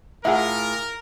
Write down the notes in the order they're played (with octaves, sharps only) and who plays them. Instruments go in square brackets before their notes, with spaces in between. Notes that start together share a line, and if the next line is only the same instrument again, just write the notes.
[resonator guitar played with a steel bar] A2 F4 G#4 [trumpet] A#4 [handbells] E5 F#5